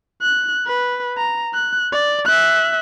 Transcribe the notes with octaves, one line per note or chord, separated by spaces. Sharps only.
F#6
B4
A#5
F#6
D5
E5 F#6